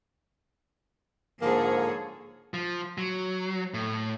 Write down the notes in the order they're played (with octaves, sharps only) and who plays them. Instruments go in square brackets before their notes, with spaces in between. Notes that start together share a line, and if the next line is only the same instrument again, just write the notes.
[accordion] G#2 D3 F3 [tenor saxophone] A#3 [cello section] G#4 A4 C#5
[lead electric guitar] F3
F#3
A2